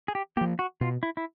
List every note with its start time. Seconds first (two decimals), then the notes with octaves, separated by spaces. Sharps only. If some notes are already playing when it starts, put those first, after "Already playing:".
0.08 G#4
0.15 G4
0.37 A#3 G4
0.41 F3
0.59 F#4
0.81 B2 F4
1.03 E4
1.17 E4